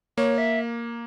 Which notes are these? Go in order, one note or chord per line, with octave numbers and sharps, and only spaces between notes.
A#3 C#5
E5